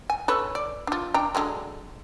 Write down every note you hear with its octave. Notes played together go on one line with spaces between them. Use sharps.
G#5
A4 B4 C#5
D5
D4 F4
D4 G5 A#5
D3 F#3 G#3